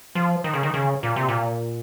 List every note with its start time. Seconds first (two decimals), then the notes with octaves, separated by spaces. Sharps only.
0.15 F3
0.44 D#3
0.54 C#3
0.63 D#3
0.74 C#3
1.03 A#2
1.16 C3
1.29 A#2